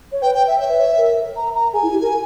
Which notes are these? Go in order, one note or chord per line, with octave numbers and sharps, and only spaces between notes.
C#5
B4 G5
G5
E5
C#5 E5
B4
C#5
A#4
A#5
A#5
G#4 G#5
E4
G4
A#4